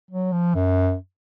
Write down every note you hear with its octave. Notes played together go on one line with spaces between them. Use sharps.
F#3
F3
F#2